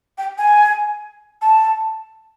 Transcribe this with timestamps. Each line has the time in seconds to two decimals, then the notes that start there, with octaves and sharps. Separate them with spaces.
0.18 G5
0.38 G#5
1.42 A5